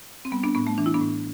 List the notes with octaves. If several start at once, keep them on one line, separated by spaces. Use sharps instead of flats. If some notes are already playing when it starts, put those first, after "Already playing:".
C4
G3 B3
B3 D4
A2 B3
A3
E3 D4
E4
B3 D4
A2